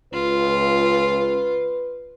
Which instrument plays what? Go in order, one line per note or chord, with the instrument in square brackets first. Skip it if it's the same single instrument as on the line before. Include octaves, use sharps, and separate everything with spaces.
[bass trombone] C#2 [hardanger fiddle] F4 [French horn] B4